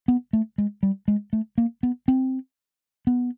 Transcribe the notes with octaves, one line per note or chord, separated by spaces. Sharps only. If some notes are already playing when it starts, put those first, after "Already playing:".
B3
A3
G#3
G3
G#3
A3
A#3
B3
C4
B3